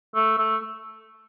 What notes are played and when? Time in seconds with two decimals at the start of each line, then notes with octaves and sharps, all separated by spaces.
0.15 A3
0.38 A3